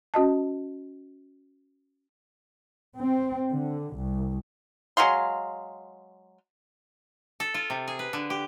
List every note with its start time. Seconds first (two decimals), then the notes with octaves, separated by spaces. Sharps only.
0.14 C#4 F#4 D#5 A5
2.97 C4
3.52 D3
3.94 C2
4.97 F#3 G#3 F5 C6
7.40 A4
7.54 F4
7.70 C3
7.88 G#4
7.99 B4
8.13 D3
8.30 G4